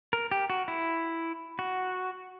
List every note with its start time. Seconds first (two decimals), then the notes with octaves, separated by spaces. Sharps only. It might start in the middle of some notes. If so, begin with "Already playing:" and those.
0.13 A#4
0.31 G4
0.50 F#4
0.68 E4
1.59 F#4